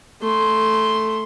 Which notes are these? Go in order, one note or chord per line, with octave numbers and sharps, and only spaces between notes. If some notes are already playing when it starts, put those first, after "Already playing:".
A3 C6